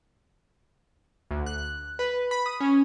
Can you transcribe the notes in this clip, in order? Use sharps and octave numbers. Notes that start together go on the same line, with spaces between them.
D2
F#6
B4
B5
D#6
C#4